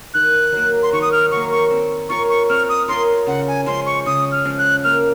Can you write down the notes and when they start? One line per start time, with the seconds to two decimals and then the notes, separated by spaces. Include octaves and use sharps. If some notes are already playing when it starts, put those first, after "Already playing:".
0.14 D#3 F#6
0.52 F#3 A#3
0.83 C6
0.92 D#3 C#6
1.02 D#6
1.12 F6
1.31 F#3 A#3 C#6
1.51 C#6
1.71 C4
2.09 F4 A#4 C#5 C#6
2.30 C#6
2.49 C4 F6
2.69 D#6
2.88 F4 A#4 C#5 C6
3.27 C#3 F#5
3.48 G#5
3.66 F3 G#3 C#4 C6
3.86 C#6
4.06 C#3 D#6
4.32 F6
4.45 F3 G#3 C#4
4.58 F#6
4.84 A#3 F6